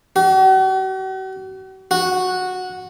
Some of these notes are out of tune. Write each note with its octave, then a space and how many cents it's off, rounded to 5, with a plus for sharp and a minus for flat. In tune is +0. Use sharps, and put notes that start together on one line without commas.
F#4 +45
F#4 -10